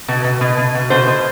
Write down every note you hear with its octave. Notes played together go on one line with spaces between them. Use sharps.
B2
B2
B2
B2
B2
B2 C5
B2